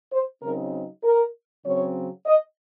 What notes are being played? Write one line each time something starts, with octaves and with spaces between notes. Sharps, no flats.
C5
C#3 F#3 C4 D#4 A#4
A#4
C#3 F#3 C4 C#5
D#5